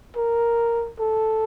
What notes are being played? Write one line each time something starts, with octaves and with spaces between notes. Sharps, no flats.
A#4
A4